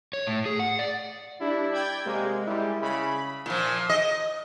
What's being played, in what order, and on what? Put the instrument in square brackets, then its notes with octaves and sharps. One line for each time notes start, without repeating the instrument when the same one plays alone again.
[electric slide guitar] C#5
A2
G#4
F#5
D5
[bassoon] G3 [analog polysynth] D4 [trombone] E4
[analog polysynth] D5 G5 G#6
[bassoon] C3 [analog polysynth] G#3 [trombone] A#3
[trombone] G3 [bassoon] E4
[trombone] C#3 [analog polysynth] B5
[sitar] A#2 F3
D#5